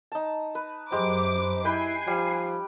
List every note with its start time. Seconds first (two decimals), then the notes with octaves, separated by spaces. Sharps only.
0.12 D#4 A5
0.55 B4
0.92 F#2 G#3 G4 C5 D6
1.65 E4 B4 G5 G#5 B5 C7
2.07 F3 G3